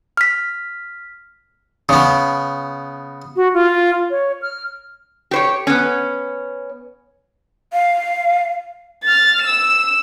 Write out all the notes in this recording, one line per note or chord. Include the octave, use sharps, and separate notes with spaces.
F6 B6
C#3 B3
F#4
F4
C#5
F6
G4 C5 C#5
B3 C#4
F5
F6 A6
E6 E7